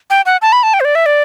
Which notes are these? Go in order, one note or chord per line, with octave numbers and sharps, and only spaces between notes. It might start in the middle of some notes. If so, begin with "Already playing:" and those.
G5
F#5
A5
B5
A5
G5
C5
D5
E5
D5